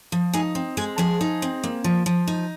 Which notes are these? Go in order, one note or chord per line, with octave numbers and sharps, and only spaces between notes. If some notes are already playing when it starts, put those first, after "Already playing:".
F3
D#4 G#4 G#5
C4
G#3 G#4 G#5
F3 G#4 G#5
D#4
C4
A#3
F3
F3
D#4